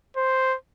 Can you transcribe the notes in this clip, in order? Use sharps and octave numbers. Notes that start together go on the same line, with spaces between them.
C5